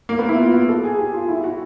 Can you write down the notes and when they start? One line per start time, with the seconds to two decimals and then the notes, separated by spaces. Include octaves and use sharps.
0.09 A#3
0.19 B3
0.29 E4
0.38 F4
0.54 F#4
0.69 A4
0.84 G#4
0.99 G4
1.14 F4
1.29 E4
1.44 F#4